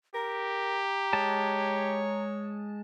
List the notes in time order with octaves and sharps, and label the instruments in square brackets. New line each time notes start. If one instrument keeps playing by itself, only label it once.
[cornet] G4 [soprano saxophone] A#4 [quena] A#5
[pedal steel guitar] G#3 A5 [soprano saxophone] C#5